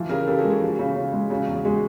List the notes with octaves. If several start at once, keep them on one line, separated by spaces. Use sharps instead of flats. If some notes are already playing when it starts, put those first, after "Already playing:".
Already playing: E3 F3
C#3 G#4 A#4
C#3 G4 A4
F#4 G#4
G#3
F#4 G#4
F3
C#3
C#3
G#3
C#3 F#4 G#4
E2
G#3 F#4 G#4